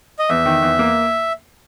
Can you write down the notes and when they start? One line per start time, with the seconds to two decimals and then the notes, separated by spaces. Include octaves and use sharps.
0.19 D#5
0.29 E2 E5
0.46 D#3
0.62 E2
0.79 A#3